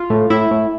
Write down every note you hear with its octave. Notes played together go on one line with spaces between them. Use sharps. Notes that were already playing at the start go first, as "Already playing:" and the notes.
Already playing: F4
A2
A2 E4
A2